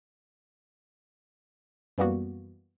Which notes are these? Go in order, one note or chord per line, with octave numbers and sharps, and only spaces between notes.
F#2 E3 G3 A#3 B3 F#4